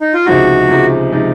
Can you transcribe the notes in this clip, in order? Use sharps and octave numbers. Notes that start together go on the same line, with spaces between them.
D#4
F4
C#2 C3 F3 G#3 D#4 F#4
C#2 C3 F3 G#3 D#4
C3 F3 G#3 D#4